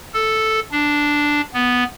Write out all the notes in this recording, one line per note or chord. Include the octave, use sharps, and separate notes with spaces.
A4
D4
B3